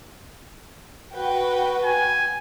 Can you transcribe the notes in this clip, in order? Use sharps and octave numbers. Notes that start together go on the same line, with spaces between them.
F#4 B4 G5
G#5